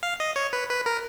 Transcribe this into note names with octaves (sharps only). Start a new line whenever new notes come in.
F5
D#5
C#5
B4
B4
A#4